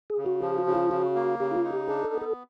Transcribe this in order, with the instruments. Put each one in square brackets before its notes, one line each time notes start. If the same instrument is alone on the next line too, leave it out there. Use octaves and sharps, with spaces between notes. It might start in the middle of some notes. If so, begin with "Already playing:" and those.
[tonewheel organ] G#4
[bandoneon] C#3
[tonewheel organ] F#4
[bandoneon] F3 [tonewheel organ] G4
[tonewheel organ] F#4
[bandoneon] C#3
[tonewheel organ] F4
[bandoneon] C#3 [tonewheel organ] F#4
[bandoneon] A#3
[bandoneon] C#3 [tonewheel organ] G4
[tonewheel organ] E4
F4
[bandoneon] D#4
[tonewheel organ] G4
[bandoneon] D4 [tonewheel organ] G#4
[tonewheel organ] A4
[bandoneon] B3
[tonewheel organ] A4